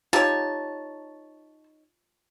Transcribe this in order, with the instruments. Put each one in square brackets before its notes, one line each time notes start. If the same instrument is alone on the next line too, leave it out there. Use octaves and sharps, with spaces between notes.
[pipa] D#4 C#5 [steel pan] F4 G4 [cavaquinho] A5